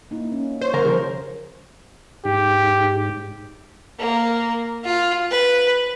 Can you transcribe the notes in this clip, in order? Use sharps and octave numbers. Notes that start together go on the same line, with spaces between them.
A#3 D#4 E4
C#4
C5 C#5
D3 A#4
C#3 F3
G#2 G4
A#3
F4
B4